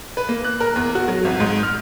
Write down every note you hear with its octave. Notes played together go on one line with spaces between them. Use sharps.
B4
A#3
F#6
A#4
E2
F#4
F#3
G#1
G#2
F6